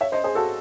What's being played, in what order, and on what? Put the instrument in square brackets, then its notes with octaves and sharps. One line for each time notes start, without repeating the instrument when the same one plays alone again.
[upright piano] C#5 E5
C5 D#5
G#4 C5
F#4 A4